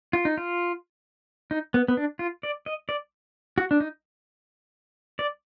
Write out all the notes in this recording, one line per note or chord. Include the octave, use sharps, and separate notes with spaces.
F4
D#4
F4
D#4
B3
B3
D4
F4
D5
D#5
D5
F#4
D4
D#4
D5